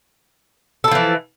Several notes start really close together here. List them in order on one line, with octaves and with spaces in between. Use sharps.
A4 E4 F3 E3